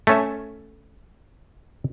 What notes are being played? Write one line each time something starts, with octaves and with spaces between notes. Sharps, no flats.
A3 C#4 E5